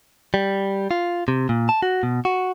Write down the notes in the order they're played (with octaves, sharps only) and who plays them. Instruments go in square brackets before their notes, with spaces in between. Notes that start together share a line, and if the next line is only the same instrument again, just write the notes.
[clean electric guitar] G3
F4
C3
A#2
A5
F#4
B2
F#4